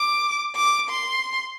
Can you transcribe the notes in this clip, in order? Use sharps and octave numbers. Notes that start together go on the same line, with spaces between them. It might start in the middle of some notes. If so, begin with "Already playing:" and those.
Already playing: D6
D6
C6